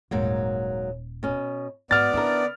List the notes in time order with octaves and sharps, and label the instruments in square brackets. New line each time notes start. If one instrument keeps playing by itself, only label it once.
[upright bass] D#1 [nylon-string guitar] G#2 F#3 A#3
[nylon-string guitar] B2 C#4
[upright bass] G#2 [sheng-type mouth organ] B3 D5 [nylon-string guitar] F#4 [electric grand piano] F6 A6
[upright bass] C#3 [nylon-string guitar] D4 E4 A#4